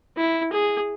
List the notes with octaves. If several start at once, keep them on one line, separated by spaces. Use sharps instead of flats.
E4
G#4